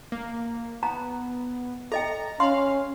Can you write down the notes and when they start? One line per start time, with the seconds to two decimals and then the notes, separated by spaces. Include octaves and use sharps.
0.12 A#3
0.83 B3 A#5
1.92 A4 D#5 G5 A#5
2.40 C#4 F5 C6